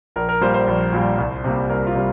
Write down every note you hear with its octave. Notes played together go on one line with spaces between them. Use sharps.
A#1 A#4
A#4
A#2 G3 C5
C5
A#1
A#2 G3
C2
C3 G3 A#3
C2 A#4
F4
C3 G3